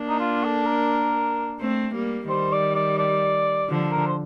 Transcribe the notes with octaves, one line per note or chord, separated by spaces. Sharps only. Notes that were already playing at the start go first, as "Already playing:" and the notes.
Already playing: A#3 D4
D#4
F4
A4
A#4
A3 C4
G3 A#3
D#3 G3 C5
D5
D5
D5
D3 F3
A#4
C5